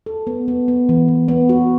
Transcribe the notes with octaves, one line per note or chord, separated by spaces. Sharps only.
A4
B3
B3
B3
E3
E3
B3
F#4